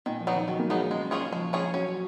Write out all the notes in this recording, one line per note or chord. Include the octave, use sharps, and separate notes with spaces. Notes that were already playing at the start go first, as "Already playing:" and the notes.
A#2 D#3
F3
F#3 B3 D#4
D#3
D#3 F#3
A#3
F#3 G#3 B3 D#4
C#3 G#3
C#4 F4 G#4 C#5
F3 G#3
C#4 F4 G#4 C#5
F#3 C#4